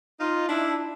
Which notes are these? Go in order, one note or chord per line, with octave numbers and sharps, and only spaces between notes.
D#4 F4
D4 E4